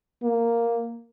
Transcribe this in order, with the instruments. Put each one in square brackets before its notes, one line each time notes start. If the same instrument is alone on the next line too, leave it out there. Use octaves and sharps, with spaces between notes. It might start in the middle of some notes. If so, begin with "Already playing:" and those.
[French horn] A#3